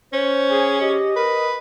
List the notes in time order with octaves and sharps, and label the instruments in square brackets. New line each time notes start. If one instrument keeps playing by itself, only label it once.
[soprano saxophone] C#4 [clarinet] C5
[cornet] G#4
[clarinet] G4 [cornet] D#5
[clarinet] A#4 [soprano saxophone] B4